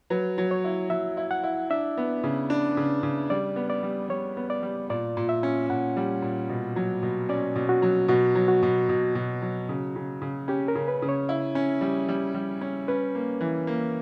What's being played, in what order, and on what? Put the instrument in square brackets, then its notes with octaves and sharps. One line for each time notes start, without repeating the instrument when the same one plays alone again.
[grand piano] F#3 [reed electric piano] B4
[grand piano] F#3
[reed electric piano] C#5
[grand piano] E4
[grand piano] F#3 [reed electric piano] E5
[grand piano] E4
[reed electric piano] F#5
[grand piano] E4
[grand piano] D4 [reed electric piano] E5
[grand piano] B3
C#3
D4
C#3
C#3
[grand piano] G3 [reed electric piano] D5
[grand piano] B3
[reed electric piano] D5
[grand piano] G3
[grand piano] G3 [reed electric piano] C#5
[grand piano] B3
[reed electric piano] D5
[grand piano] G3
[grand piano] A#2 [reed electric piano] D5
[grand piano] A#2
[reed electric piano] E5
[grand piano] C#4
[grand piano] A#2 [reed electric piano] F#5
[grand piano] G3
A#2
B2
F#3
B2
[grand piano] C#4 [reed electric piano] D5
[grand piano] B2
[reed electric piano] F#4
[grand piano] F#3
[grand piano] B2 [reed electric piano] F#4
[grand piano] F#3
[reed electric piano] F#4
[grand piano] B2
B2
B2
F#3
C#3
C#3
C#3
[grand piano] C#4 [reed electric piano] G4
[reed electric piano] A#4
[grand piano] C#3
[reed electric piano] B4
[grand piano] C#3
[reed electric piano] C#5
[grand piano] E4
C#4
G3
G3
G3
C#4
[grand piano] C#4 [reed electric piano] B4
[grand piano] A#3
E3
A#3